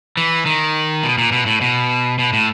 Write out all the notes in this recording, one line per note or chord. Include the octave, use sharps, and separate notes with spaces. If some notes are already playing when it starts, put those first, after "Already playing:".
E3
D#3
B2
A#2
B2
A2
B2
B2
A2